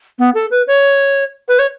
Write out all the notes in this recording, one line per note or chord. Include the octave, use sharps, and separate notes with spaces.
B3
A4
B4
C#5
B4
C#5